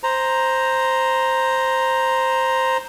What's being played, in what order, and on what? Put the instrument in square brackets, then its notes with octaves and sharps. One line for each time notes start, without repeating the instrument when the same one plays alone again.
[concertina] C5 A#5